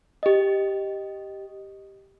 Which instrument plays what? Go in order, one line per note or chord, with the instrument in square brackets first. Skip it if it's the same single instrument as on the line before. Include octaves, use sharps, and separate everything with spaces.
[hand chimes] G4 D#5